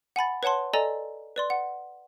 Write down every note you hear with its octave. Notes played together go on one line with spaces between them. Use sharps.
F#5 G#5 B5 A6
B4 C#5 F#5 A5 C6
A4 D5 D#5 G#5 A#5
B4 D5 C6
F#5